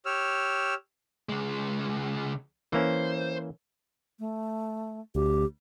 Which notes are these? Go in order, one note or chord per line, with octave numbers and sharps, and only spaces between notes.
G4 C#5 E6 F6
C#2 G#3
E3 A#3 C#4 C5
A3
D2 G4